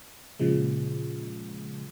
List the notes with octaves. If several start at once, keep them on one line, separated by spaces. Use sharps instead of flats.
A#2 C#3 F3 G#3